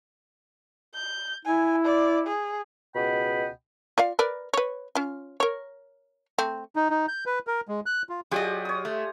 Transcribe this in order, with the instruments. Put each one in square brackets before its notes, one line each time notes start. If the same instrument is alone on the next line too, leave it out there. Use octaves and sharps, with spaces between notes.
[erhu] G6
[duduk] E4 [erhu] G#5
[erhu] D5
G#4
[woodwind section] C#2 B2 D#5 F#5 G5 B5
[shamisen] F4 D5 F5
A#4 B4 D5
B4 C#5
C#4 F4
A#4 C#5
A3 C4
[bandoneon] D#4
D#4
G6
B4
A#4
G#3
F#6
F4
[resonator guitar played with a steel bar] F#3 D5 D#5 [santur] F4 G4 G#4
[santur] C#5 D#6
[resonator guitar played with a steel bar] A3